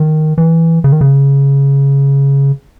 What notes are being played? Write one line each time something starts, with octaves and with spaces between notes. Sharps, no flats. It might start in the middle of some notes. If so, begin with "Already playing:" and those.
Already playing: D#3
E3
C#3
D#3
C#3